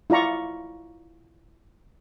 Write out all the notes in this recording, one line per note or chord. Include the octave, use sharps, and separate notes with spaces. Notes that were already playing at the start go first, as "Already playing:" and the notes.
E4 F4 D5 A#5 C#6